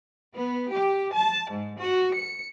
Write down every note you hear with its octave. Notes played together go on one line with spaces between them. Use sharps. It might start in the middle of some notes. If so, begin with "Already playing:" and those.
B3
G4
A5
G#2
F#4
C#7